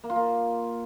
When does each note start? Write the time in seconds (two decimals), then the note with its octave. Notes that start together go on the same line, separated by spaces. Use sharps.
0.04 A#3
0.10 F4
0.16 A#3